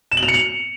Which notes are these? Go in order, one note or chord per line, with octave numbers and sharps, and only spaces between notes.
E7
F#7
F7
C#7
F7